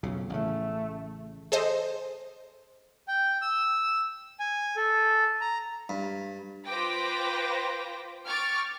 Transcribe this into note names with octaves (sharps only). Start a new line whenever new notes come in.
B1 F2 C#3
A1 C#3 A3
G#4 A4 C5 D#5
G5
E6
G#5
A4
A#5
G2
F4 B4 C5 G5 D6 A#6
G5 C#6 D6 F6 A6